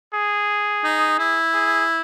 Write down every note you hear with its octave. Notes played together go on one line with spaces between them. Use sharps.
G#4
D#4
E4
G#4